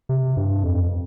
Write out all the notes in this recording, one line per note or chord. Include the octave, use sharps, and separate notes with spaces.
C3
G2
F2